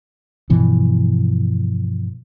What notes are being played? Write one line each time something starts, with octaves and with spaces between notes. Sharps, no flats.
G2 B2 E3 F3